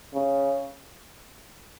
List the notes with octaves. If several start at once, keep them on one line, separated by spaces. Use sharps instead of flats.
C#3